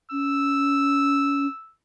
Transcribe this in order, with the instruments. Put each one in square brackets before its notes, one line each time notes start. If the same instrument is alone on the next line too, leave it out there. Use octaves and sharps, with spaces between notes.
[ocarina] C#4 [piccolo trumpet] E6